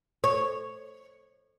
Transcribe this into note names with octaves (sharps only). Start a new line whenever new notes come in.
C#5